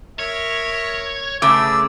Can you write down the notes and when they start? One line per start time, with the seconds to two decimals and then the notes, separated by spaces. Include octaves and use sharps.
0.19 A#4 C#5 E5
1.42 C#3 A3 B3 G#4 D6 E6